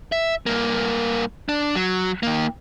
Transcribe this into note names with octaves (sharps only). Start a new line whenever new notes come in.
E5
G2 A#3
D4
F#3
D#3 A#3